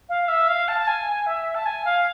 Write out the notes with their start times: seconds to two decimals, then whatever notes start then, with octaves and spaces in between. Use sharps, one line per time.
0.09 F5
0.28 E5
0.48 F5
0.68 A5
0.79 A5
0.87 G#5
1.26 E5
1.55 A5
1.66 G#5
1.85 F5